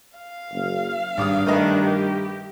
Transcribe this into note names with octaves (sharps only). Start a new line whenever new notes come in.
F5
F#1
G#1 G2 D6 D#6
D#3 A3 D4 B4 D#5
G4